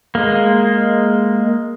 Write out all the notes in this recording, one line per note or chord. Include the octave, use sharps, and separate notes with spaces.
G#3 A#3